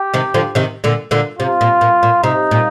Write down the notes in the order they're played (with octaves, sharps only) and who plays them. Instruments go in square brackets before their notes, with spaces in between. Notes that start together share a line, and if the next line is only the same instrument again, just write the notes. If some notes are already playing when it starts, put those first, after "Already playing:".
Already playing: [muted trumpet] G4
[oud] C3 D#3
D3 F3
C3 D#3
A#2 D3
A#2 D3
[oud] C3 [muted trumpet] F4
[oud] A#2
A#2
A#2
[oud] C3 [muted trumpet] D#4
[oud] A#2